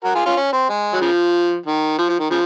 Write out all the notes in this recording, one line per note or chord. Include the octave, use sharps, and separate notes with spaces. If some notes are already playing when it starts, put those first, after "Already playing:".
F#4 A#4
F4 G#4
C#4 F4
C#4
C4
G#3
F#3
C#3 F3
D#3
F3
F3
D#3
C#3 F3